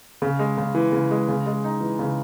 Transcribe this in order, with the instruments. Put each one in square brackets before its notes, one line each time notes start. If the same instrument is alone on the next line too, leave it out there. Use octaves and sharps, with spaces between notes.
[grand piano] C#3
G#3
C#3
E3
C#3
G#3
C#3
G#3
D#4
E3
C#3